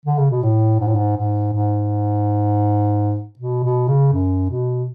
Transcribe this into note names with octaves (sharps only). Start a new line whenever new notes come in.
D3
C#3
B2
A2
G#2
A2
G#2
G#2
G#2
B2
B2
C#3
F#2
B2